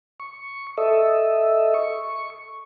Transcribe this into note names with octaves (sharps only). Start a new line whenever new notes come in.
C#6
A4 D#5 E5
C#6